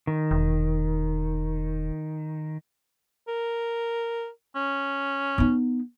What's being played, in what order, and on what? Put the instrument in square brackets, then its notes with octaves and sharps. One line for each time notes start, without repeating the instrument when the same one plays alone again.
[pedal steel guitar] D#3
[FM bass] E1
[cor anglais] A#4
C#4
[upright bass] B3 D#4